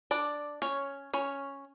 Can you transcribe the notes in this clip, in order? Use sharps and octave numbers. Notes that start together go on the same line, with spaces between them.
D4 D5
C#4 C#5
C#4 C#5